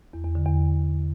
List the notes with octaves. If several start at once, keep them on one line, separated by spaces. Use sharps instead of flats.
E2
E2
D3
E2